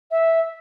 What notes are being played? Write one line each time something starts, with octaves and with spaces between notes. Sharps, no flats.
E5